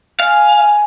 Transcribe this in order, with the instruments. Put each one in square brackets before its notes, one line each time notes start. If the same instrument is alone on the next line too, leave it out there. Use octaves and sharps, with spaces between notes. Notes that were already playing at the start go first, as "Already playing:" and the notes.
[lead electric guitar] F5 [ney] G#5